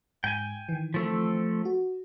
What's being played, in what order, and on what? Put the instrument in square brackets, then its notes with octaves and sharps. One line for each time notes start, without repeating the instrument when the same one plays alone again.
[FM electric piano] G#2 [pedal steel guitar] G5 G#5
[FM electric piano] D#3 E3
[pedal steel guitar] F3 A3 C4
[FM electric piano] F#4